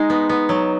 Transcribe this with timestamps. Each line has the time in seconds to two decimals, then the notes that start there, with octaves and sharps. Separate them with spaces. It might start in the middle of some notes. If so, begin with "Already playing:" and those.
Already playing: G#3 D#4
0.10 B3
0.29 B3
0.49 F#3